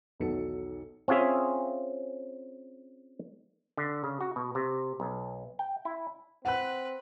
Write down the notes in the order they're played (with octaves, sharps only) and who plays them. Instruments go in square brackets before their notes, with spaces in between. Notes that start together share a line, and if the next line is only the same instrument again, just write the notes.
[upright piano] B1 E2 D#3 F#3 A4 C#7
[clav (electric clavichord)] C4 C#4 F4 G#4 E5
D3
C#3
F#4
B2
C3
B1
G5
E4
[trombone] C4 [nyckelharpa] B4 [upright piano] F#5 F#6